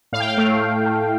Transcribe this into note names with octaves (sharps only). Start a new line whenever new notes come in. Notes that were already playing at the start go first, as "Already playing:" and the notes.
A2 F5
G5
F5
A3
A3
A3